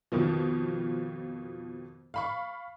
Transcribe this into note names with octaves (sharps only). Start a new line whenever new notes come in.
F2 B2 D#3 F3
F5 B5 C#6